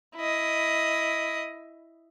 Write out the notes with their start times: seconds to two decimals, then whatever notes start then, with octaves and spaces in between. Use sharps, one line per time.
0.16 E4 D#5